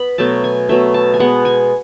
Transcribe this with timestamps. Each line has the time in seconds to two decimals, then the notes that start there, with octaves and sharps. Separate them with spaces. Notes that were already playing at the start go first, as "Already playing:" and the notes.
Already playing: B3 B5
0.18 B2 F#3 A3 A5
0.44 G#5
0.69 B2 F#3 A3 E5
0.94 A5
1.14 G#5
1.19 B2 G#3 B3 F#5
1.45 G#5